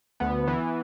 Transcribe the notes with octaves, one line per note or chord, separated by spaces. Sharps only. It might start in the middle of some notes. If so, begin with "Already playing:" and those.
D2 B3
E3